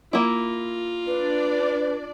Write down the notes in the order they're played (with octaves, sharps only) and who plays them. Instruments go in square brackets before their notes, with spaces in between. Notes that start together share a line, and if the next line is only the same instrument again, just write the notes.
[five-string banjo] A#3 E4 [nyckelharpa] F4
[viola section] D4 D5 [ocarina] B4